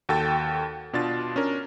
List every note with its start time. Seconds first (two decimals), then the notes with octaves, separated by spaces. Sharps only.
0.09 D#2 F#4 A4 G5 A6
0.93 B2 D4 F4 A6
1.36 C#4 D4 A#4